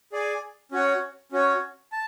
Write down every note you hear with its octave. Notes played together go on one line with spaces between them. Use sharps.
G#4 D5 G#5
C#4 F#4 C#5 F#5
C#4 F#4 C#5
A5